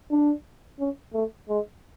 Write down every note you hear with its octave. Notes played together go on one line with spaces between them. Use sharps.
D4
C#4
A3
G#3